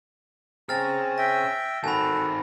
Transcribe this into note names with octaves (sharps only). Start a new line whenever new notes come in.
C4 C#4 G#4 A#5 F6 A6
E5 G5 A#6
D#3 C4 F#4 A4 G#5 B5